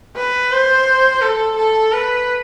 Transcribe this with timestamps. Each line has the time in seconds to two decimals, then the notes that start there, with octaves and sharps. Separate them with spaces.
0.16 B4
0.52 C5
1.21 A4
1.57 A4
1.92 B4